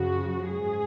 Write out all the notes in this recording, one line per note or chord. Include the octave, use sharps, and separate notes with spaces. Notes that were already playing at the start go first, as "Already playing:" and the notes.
Already playing: F#2 C#3 F3 F#4
G#2 G#4